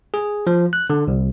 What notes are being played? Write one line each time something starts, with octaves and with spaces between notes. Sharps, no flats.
G#4
F3
F#6
D3
C2